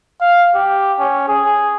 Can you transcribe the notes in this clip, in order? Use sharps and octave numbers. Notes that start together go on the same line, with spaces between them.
F5
G4
C#4
G#4